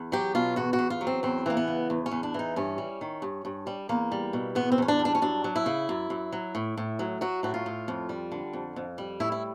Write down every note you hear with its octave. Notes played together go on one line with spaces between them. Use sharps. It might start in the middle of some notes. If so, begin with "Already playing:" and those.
Already playing: E2
F#3 G4
B2 F4
E2 F#4
F#4
E2
F4
F#3
C4
E2 C4
E3 A#3
B3
C#3
E2
C#4
E2
D4
E3 D#4
G2 C#4
G3
D#3
G2
G2
G3
E2 A#3
G3
B2
E2 B3
C4
E2 C#4
D4
G3
D4
C#4
F#2 D4
F#3
E4
C#3
F#2
F#2
F#3
A2
A2
F#3
F#3 F#4
A2 F#4
F4
A2
F2
G3
D3
F2
F2
G3
A2 E4
E4